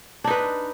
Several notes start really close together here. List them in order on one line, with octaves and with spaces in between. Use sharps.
D4 D#4 B4